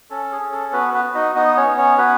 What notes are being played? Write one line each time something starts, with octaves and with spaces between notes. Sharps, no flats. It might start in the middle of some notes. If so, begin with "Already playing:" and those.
C#4 A4
G#4
C#4
A4
B3 F#4 B4
B3 B4
F#4
D#4 D#5
B3 D#4 D#5
C#4 C#5
B3
C#4 C#5
B3 F#4 B4